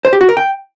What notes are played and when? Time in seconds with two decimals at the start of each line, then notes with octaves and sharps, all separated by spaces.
0.05 C5
0.13 G4
0.21 F#4
0.29 A#4
0.37 G5